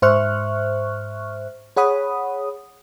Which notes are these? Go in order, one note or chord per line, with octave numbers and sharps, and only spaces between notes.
G#2 C5 E5 C#6 F6 F#6
G#4 C#5 F#5 B5 D#6